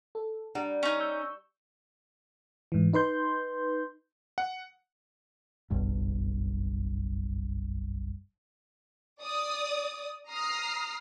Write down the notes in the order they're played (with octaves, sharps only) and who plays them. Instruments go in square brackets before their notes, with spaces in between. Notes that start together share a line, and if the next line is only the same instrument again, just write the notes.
[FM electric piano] A4
[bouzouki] G3 [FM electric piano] D4 F#5 A#5
[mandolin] C#4 D#4
[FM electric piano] C#6 E6 G6
G#2 E3
D#4 B4 C6 G6
[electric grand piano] F#5
[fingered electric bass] F#1 B1 G2
[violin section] D5 D#6
A#5 D#6 F6 C7